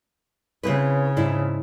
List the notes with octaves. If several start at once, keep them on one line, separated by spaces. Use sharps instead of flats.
C#3 C4 E4 B4
G#2 D4 E4